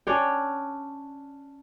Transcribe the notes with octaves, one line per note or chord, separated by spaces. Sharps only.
C#4 D4 C#5 G5